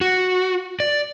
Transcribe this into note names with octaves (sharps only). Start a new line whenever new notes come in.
F#4
D5